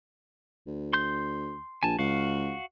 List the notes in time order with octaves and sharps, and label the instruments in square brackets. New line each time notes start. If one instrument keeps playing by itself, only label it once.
[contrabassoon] D2
[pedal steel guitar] C6 G6
[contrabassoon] A#1 [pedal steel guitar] G#5 A5
[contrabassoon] C#2 [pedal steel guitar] F#4 F5